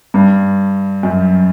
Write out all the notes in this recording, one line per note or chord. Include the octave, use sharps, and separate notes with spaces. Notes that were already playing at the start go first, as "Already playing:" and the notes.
G2
F#2